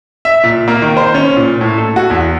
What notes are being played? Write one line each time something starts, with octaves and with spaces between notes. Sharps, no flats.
E5
A#2
A#3
D#3
C5
C#4
A#2
A2
A4
F#4
E2